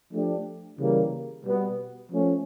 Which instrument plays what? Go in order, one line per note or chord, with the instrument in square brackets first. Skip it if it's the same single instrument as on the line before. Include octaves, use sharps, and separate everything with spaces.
[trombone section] F3 A3 D4 G4
C#3 E3 G3 A#3
B2 G3 B3
F3 A3 C#4